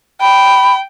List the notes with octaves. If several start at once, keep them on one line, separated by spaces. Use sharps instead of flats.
G5 B5